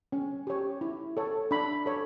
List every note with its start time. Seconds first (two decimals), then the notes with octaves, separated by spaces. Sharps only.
0.12 C#4
0.47 G4 C#5
0.81 E4
1.17 A4 C#5
1.51 D4 B5
1.86 A4 C#5